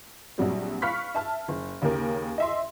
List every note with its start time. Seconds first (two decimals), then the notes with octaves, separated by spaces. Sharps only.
0.38 A#1 F#3 G3 C4
0.82 F5 B5 C#6 F6 F#6 B6
1.15 E5 A5 F6
1.48 F#1
1.82 D#2 C#3 G4 A#4
2.38 D#5 E5 C6